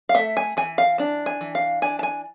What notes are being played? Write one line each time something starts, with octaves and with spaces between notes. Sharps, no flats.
F5
A3 E5
G#5
E3 G#5
F5
D4 A5
G#5
E3
F5
D4 G#5
A5
G#5